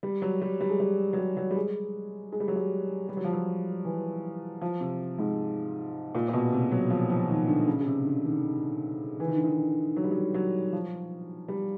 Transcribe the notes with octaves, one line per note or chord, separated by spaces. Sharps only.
G3
F#3
G3
G3
G#3
G3
F#3
G3
F#3
G3
G#3
G#3
G3
F#3
G3
G3
F#3
F3
F#3
E3
F3
C3
G#2
A#2
A#2
B2
C3
F#3
F3
F3
D#3
D3
C#3
C#3
C3
D3
D#3
E3
D#3
D3
D#3
F#3
G3
F#3
F#3
F3
G3